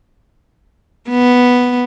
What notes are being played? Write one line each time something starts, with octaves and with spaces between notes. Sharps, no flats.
B3